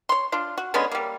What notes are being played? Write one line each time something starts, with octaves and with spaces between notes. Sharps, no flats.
C#5 C6
D4 F4
F#4
D3 G#3 B3 C#4
G3 A#3